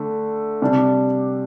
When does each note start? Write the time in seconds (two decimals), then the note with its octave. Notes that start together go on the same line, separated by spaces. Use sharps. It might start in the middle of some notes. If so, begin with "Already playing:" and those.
Already playing: D3 A3
0.62 C3 G3 D4